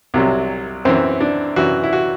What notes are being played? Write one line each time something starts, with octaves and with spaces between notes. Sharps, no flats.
C2 C3 F#3
F#2 E3 C4
D4
F#2 E3 F#4
E4
F#4